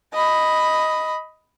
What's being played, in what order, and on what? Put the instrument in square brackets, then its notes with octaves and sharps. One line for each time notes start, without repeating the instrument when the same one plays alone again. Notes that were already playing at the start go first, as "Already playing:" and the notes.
[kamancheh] D#5 B5